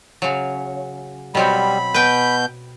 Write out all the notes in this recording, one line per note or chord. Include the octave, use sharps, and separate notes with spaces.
C#3 F#3
B2 F#3 G3 C4 B5
B2 B4 G5 G6